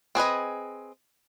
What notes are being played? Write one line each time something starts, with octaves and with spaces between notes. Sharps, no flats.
C4 G#4 B4 D#5